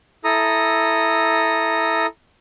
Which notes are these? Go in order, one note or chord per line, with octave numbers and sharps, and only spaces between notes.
E4 A4 A#5 D#6